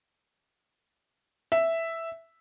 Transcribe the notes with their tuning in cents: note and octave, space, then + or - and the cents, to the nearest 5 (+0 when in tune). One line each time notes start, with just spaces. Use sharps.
E5 +0